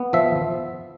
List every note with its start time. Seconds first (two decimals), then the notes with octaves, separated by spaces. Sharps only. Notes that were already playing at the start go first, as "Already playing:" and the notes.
Already playing: B3
0.13 F3 E5